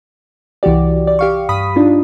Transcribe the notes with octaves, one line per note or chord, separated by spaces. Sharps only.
C2 E3 F#4 G4 D5
D5
G4 F5 C#6
G2 B5 D#6 B6
D4 D#4 F4